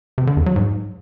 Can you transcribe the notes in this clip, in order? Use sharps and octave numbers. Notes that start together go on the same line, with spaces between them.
C3
D3
E2
F#3
G#2